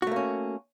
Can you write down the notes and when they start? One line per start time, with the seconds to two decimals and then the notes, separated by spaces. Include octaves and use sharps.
0.02 F#4
0.07 A3
0.11 A#3
0.16 C#4